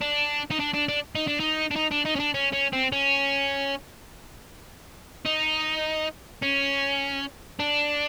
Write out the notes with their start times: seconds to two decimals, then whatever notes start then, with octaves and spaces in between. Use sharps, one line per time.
0.01 D4
0.50 D#4
0.59 D4
0.74 D4
0.88 D4
1.15 D#4
1.27 D4
1.40 D#4
1.71 D4
1.76 D#4
1.91 D4
2.05 D#4
2.15 C#4
2.19 D4
2.34 C#4
2.53 C#4
2.73 C4
2.92 C#4
5.26 D#4
6.42 C#4
7.60 D4